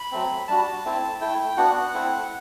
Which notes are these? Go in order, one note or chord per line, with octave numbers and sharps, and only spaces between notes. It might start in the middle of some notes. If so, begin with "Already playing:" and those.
Already playing: B5
F#3 A3 C4
G3 D4 F#4 A5
A3 C4 E4
A3 E4 G5
B3 D4 F#4 F#5
A3 C4 E4